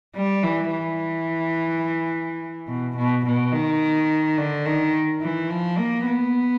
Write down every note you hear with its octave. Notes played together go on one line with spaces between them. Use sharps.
G3
E3
E3
B2
B2
B2
D#3
D3
D#3
E3
F3
A#3
B3